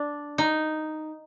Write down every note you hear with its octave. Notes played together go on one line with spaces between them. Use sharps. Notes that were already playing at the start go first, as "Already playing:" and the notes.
Already playing: D4
D#4